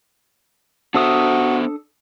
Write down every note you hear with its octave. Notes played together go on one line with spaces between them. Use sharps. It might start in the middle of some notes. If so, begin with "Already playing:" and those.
B3 D4 F#4 A4 C5 E5 D#6